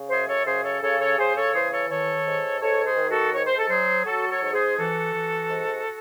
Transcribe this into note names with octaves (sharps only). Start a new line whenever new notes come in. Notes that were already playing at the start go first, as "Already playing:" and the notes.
Already playing: C#3
F#2 G#4 C5
A4 C#5
C#3 G#4 C5
A4 C#5
C#3 A4 C#5
A4 C#5
C#3 G#4 C5
A4 C#5
E3 G#4 C5
A4 C#5
D#3 A4 C#5
G#2
G#2 A4 C#5
G#4 C5
D#3
F#4 A4
G#2 C#5
C5
A4
F#3 G#4 C5
F#3 F#4 A4
A4 C#5
G#2 C#5
G#4 C5
E3 F#4 A4
E3
G#2